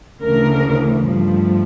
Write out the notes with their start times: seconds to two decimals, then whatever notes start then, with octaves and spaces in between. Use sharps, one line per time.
0.21 D2 C#3 E3 A3 A#4
1.05 G2 F3 A3